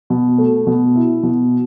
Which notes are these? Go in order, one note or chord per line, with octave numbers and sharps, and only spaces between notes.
B2
A3
B2
E4
B2